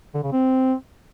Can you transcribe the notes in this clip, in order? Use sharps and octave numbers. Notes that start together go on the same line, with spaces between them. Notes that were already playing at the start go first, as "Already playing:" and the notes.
D3
C#3
C4